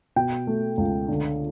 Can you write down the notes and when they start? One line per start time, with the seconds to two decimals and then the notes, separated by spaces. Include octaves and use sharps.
0.16 B2 G5
0.47 A3
0.77 C#2
1.09 D3